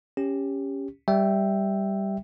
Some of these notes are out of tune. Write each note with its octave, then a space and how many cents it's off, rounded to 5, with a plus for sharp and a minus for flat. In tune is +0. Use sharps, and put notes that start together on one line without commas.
C#4 +0 G4 +15
G3 +0 E5 +0 G5 +0